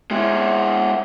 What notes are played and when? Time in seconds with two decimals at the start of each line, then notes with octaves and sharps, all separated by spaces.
0.11 G#3 E4